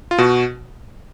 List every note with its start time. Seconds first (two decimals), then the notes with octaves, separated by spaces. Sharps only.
0.11 F4
0.18 B2 F#4